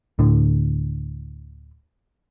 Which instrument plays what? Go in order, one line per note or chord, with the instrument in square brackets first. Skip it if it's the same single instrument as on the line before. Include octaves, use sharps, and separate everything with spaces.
[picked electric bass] D1 A2 D3